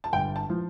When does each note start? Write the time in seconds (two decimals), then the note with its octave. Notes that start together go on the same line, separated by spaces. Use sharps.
0.04 A5
0.13 G1 G5
0.36 A5
0.50 F3